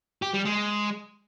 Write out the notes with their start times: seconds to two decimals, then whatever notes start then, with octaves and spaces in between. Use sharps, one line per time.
0.22 G4
0.34 G3
0.45 G#3